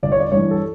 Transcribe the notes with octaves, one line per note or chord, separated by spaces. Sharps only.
G1 D5
C#5
D5
G2 E3 C#5
A4